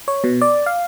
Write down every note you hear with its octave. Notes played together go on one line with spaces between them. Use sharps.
C#5
B2
D5
F5